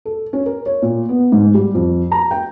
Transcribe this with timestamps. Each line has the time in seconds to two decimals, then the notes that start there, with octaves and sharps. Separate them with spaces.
0.05 A4
0.33 C#4
0.46 A#4
0.66 C#5
0.82 A#2
1.09 B3
1.32 G#2
1.54 G3
1.74 F2
2.12 A#5
2.31 G5